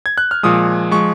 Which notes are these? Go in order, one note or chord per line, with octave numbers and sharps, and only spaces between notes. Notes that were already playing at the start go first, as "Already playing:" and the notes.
G#6
F#6
F6
A#2 F3 G#3 D#6
F3 G#3 C#6